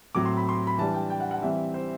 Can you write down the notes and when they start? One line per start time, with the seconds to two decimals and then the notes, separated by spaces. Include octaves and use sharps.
0.15 A2 F#3 C4 D6
0.25 C6
0.37 B5
0.49 C6
0.67 B5
0.78 E3 G3 D4 A5
0.94 G5
1.10 G5
1.20 F#5
1.31 F#5
1.42 E3 G3 C4 E5
1.74 C5